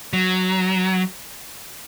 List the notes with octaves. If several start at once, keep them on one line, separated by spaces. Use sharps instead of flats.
F#3